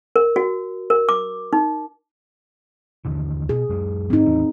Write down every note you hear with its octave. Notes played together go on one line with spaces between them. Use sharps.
A#4
F#4
A#4
D6
D#4
D#2 D3 E3
B2 G#4
F#2 G#3
G#2 C4 D#4
E2 A2 E3